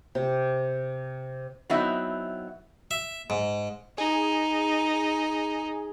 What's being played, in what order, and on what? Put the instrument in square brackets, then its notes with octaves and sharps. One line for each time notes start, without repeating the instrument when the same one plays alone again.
[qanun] C3
[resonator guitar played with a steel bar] F#3 B3 C4 D#4 E4 E5
[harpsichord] E5
G#2
[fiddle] D#4 [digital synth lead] G#4